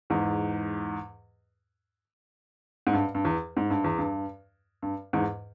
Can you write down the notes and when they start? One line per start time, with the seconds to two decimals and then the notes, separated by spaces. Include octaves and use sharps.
0.10 E2 G#2
2.87 G#2
2.93 G2
3.15 G2
3.25 E2
3.57 G#2
3.70 G2
3.84 E2
3.98 G2
4.82 G2
5.13 E2 G#2